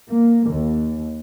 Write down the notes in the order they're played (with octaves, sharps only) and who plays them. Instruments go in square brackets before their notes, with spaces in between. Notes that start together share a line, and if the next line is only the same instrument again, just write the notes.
[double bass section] A#3
D#2